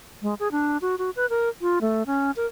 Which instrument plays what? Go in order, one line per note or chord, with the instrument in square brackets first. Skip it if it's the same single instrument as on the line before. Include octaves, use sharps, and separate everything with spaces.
[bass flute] G#3
G#4
D4
F#4
F#4
B4
A#4
F4
A3
C#4
A#4